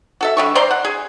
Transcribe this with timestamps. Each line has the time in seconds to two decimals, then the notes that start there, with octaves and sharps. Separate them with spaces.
0.21 F#4 A4 E5
0.37 D3 G3 C#6
0.55 C5 D5 A#5 C6
0.71 F#5
0.85 G#4